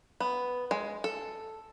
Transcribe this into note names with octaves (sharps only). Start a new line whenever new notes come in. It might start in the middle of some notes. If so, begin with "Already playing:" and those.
B3
G#3
A4